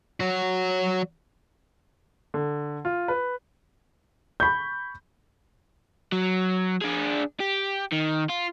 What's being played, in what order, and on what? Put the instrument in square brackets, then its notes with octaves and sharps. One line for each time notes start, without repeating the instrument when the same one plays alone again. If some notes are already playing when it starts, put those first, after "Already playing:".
[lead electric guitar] F#3 F#4
[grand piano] D3
F4
B4
[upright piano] B5 C#6 G6
[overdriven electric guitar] F#3
D4 G#4
G4
D#3
F4